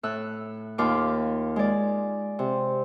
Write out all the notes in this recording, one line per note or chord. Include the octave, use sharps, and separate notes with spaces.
A2 E6 F#6
D#2 F4 D6
G#3 D5
C3